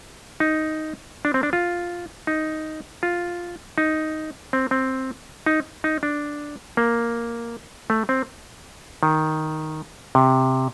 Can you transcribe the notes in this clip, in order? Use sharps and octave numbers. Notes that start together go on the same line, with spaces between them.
D#4
D4
C4
D4
F4
D#4
F4
D#4
C4
C4
D#4
D#4
D4
A#3
A3
C4
D#3
C3